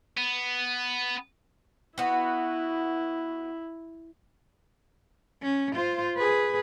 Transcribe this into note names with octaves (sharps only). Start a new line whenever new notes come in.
B3
B3 E4 F#4
C#4
F4 C5
G#4 B4